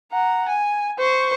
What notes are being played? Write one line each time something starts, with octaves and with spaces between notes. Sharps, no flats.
F#5 A#5
G#5
C5 C#6